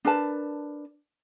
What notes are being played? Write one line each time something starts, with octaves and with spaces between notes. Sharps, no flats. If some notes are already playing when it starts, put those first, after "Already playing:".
D4 A#4 B4 A5